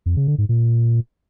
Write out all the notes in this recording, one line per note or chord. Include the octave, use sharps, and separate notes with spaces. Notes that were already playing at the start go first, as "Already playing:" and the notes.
F2
C#3
D3
G#2
A#2